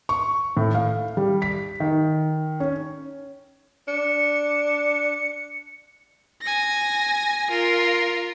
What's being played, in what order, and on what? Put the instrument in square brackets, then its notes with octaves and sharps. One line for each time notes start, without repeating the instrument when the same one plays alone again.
[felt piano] C#6
A2
F5
G3
B6
D#3
C#4
[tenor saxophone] D4 [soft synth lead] C#7
[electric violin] G#5 A#6
F4 A#4